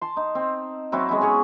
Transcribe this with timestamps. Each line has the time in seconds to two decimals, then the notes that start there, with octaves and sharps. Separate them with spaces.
0.01 A5 C6
0.17 D#4
0.35 C4
0.92 F#3 C4 E4 F#4
1.09 G#3 B3 C#4 E4
1.21 C#4 G#4 C#5